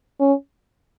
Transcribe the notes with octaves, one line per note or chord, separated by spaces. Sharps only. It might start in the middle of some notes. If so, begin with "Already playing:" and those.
C#4